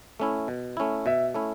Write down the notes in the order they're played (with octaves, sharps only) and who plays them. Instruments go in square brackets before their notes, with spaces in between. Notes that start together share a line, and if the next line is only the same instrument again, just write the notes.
[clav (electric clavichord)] A3 C#4 E4
B2
A3 C#4 E4
[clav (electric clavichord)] B2 [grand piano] E5
[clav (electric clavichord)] A3 C#4 E4